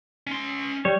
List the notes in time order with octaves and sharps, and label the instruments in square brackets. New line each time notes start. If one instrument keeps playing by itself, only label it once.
[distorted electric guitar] C#4 C6
[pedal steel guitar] G3 C#5